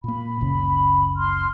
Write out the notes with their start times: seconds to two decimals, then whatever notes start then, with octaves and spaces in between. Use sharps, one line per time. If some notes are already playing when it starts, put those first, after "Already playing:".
0.04 A#2 A#3 B5
0.41 F#1 C#2 C#3
1.16 C6 F6